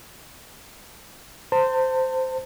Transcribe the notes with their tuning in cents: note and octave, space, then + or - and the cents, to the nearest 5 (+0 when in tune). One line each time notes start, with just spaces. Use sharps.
C5 -10 A5 +35